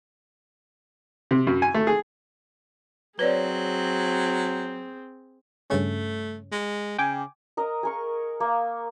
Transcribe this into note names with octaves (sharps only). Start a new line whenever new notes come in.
C3
F#2
G#5
A3
G#4
F#3 C4 G#4 B4 C#5 D5
G2 C#3 A3 C#4
G#3
C#3 G5 G#5 D6
A#4 D#5 A#5
G#4 A#4 C#6
A#3